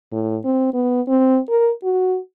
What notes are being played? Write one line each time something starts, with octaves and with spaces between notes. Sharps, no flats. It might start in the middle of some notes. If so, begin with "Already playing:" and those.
A2
C4
B3
C4
A#4
F#4